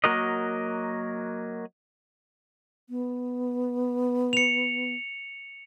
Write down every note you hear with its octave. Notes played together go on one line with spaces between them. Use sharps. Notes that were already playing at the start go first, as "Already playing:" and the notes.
F#3 A#3 F#4 A#4 D#5
B3
C#7 F7